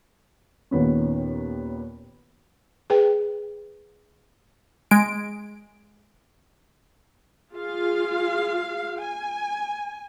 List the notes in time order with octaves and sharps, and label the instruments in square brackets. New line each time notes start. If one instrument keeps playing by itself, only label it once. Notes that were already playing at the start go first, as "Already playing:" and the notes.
[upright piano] D#2 A#2 D#3 B3 C#4
[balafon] G#4 B4 G5
[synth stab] G#3 D7
[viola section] F4 G#4 F5
G#5